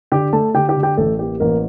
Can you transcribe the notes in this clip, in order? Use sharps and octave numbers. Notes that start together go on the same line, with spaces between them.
D3 G4 G5
A3 A4 A5
D3 G4 G5
G4 G5
D3
G4 G5
A1 A3 A4
A#3 G4
A1 A#3 A#4